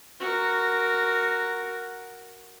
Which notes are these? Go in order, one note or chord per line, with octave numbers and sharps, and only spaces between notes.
F#4 A#4